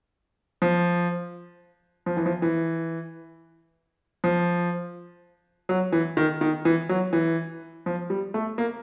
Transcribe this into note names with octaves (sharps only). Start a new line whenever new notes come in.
F3
F3
E3
F3
E3
F3
F#3
E3
D#3
D#3
E3
F#3
E3
F3
G3
A3
A#3